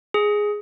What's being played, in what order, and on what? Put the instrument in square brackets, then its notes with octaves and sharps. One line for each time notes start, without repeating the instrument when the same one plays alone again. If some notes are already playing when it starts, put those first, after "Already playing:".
[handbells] G#4